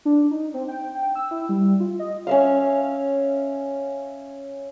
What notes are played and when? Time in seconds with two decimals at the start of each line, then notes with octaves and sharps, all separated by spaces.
0.05 D4
0.31 D#4
0.54 C4
0.68 G5
0.95 G5
1.15 E6
1.31 E4
1.49 G3
1.80 F4
1.99 D#5
2.27 C#4 E5 F5